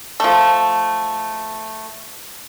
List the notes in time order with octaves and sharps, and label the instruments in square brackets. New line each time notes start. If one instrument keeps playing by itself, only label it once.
[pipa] F3 A3